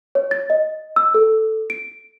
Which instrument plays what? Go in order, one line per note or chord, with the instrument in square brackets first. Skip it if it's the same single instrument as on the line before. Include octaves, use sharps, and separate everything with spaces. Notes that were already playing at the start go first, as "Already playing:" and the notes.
[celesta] C#5
A6
D#5
E6
A4
D7